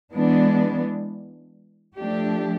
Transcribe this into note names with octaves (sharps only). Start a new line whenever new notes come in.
E3 G#3 B3 D4
F3 A3 D4 G4